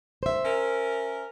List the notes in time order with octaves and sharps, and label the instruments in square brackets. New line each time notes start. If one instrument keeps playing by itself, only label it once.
[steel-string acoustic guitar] C5 E5
[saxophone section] C#4 A#4